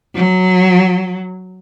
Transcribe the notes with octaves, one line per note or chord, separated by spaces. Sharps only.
F#3